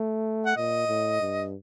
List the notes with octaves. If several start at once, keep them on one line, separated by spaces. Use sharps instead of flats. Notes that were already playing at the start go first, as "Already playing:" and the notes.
Already playing: A3
F#5
A#2 D#5
A2
G2